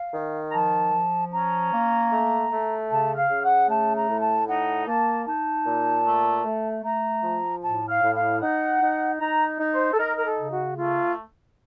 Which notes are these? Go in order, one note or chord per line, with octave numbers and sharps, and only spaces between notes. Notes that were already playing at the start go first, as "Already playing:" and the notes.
Already playing: F5
D#3
A#5
F3 A5
F3
C#4 A#5
A#3
A3
A3
C#3 A5
F5
C#3
F#5
A3 A5
A#5
A2
A5
D#4 F#5
A#3 A5
D#4 A5
A#2
A3
A3
A3 A#5
F3
A2 A5
F5
A2
F5
D#4 F#5
D#4
D#4 A#5
D#4
C5
A4
D#4 A#4
A#4
A4
C#3
F#4
A3 F4